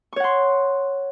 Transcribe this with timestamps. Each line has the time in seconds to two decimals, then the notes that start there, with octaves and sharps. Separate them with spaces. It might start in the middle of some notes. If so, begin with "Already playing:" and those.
0.13 C#6
0.16 C#5
0.20 F#5
0.24 C6